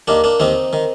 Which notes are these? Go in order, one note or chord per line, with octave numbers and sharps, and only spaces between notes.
D#2 D#3 A#3 D4
A#3 D4
D#2 D#3 C4 D#4
D#3